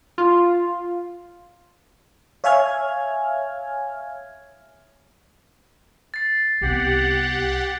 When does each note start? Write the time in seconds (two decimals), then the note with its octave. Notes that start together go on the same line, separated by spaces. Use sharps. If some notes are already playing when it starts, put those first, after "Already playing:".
0.18 F4
2.44 C#5 E5 F5 G#5 F6 G#6
6.14 A6 C7
6.61 C2 B3 G4 F#5